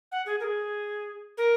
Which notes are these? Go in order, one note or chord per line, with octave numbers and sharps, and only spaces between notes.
F#5
G#4
A#4
G#4
A#4